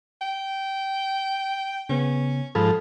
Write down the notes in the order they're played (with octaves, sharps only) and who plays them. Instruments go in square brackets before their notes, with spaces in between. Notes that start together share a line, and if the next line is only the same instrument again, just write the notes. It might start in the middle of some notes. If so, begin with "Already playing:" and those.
[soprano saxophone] G5
[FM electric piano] C#3 B3 [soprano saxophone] C#4
[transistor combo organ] G#2 F3 [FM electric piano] A4 A5 B5